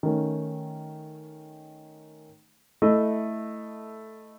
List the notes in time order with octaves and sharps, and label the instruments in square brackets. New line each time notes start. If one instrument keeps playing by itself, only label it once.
[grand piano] D#3 A3 C#4
A3 E4 A4 D#5